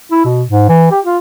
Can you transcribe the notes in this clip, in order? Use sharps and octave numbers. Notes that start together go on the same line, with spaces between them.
E4
B2
G#2
E3
G4
F4